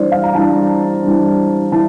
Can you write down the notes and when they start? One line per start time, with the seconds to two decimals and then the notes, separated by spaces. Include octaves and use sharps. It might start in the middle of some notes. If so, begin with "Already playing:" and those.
Already playing: E3 G3 D4 C5 D5
0.12 F5
0.23 A#5
0.34 E3 G3 D4 A5
1.04 E3 G3 D4
1.72 E3 A5